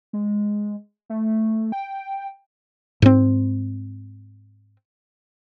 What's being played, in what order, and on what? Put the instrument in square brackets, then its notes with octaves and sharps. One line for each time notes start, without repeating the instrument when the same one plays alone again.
[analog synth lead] G#3
A3
G5
[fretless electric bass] G#2 C4